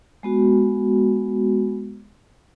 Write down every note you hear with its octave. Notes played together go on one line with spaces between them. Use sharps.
G#3 B3 F#4